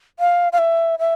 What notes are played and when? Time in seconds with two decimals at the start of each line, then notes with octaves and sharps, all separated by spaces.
0.19 F5
0.53 F5
0.58 E5
0.99 E5